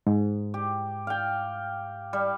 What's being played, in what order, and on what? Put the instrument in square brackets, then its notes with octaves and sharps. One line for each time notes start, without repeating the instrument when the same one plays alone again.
[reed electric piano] G#2
[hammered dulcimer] G4
F5 G5
G3